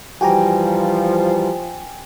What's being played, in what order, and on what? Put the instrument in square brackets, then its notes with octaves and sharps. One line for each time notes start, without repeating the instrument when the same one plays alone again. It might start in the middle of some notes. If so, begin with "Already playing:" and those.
[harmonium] E3 G3 [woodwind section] F3 [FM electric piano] F#4 G4 A#5 [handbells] G5 G#5